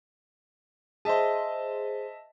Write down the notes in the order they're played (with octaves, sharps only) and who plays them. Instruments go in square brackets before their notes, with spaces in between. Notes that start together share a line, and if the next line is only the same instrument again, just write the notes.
[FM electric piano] G#4 C5 [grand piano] D#5 E5 A5